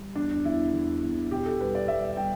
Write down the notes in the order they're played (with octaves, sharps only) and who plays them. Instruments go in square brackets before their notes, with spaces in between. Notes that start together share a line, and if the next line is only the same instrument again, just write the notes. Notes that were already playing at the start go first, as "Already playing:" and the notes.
Already playing: [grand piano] G3
E2 D4
E2 E4
E2
E2
B2 G4
A4
G3 B4
D5
G3 E5
G3 G5